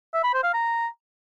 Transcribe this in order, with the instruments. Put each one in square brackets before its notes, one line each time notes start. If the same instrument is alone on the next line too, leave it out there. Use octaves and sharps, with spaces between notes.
[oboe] E5
B5
C5
F5
A#5